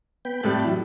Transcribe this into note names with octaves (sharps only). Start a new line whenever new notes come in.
B3 G5 B5
F2 A2 G3 G5 A5 F#6
E3 F#3 E4